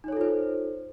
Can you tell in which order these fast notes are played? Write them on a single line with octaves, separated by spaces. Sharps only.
D#4 C#5 A4 F4 C5